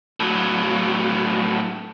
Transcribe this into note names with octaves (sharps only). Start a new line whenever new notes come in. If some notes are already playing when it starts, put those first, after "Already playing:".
A2 F#3